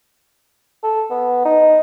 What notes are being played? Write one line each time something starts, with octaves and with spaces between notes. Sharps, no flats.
A4
B3
D#4